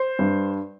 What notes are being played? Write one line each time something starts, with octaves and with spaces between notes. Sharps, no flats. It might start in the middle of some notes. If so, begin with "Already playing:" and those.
Already playing: C5
G2